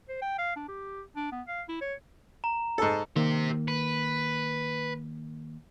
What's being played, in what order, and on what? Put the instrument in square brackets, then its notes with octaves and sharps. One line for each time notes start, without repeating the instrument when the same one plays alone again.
[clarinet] C5
G5
F5
D4
G4
D4
B3
F5
E4
C#5
[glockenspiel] A#5
[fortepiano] G#2 A4
[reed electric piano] D#3 A#3 [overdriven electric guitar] G4 C5
[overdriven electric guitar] B4